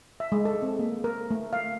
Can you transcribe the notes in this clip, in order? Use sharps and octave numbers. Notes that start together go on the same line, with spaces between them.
E5
G#3
A4
C4
A#3
A#4
A3
F5